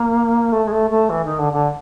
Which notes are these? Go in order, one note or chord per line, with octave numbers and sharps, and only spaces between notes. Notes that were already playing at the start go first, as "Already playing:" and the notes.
Already playing: A#3
A3
G#3
A3
A3
E3
D#3
D3
D3